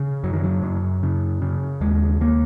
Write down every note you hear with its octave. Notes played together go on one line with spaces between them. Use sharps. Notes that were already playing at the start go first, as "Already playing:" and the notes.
Already playing: C#3
F#2 F#3
D#3
F#3
F#2
C#3
C#3
D#2 G#3
D#2 A#3